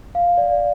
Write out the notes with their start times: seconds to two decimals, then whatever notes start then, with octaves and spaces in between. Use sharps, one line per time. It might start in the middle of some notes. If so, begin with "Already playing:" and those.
0.15 F5
0.38 D5